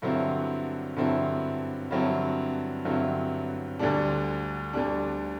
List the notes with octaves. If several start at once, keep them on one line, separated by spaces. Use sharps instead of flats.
G2 D3 F#3 C4 E4
G2 D3 F#3 C4 E4
G2 D3 F#3 C4 E4
G2 D3 F#3 C4 E4
D2 D3 G3 D4
D2 D3 G3 D4